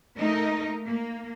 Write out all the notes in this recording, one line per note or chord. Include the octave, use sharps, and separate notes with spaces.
A3 A#3 D#4 A#4 D#5
A#3